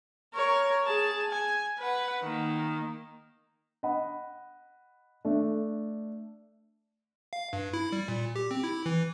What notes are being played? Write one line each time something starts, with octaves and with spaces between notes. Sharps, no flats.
A#4 C#5
G#4 A5
G#5
B4 F#5
D#3 A#3
D#5 F#5 B5
A3 D4
F5
G2
E4
G3
A#2
G4
C4
E4
E3